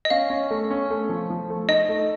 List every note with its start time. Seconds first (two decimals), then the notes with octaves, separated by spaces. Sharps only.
0.05 D#5
0.10 C#4 F5
0.30 C#4
0.51 A3
0.70 C#4
0.91 A3
1.09 F3
1.30 F3
1.50 A3
1.69 D#4 D#5
1.89 A3